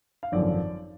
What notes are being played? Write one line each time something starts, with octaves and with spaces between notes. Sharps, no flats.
F5
G#1 F#2 D3 F3 D5